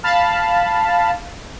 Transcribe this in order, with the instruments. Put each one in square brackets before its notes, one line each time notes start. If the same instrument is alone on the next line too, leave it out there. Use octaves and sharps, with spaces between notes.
[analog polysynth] F5 A5 B5